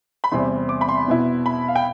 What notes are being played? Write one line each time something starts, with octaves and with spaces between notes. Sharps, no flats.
B5
E2 C3 G3 C4 C6
D6
B5
C6
B2 B3 E4
B5
F5
G5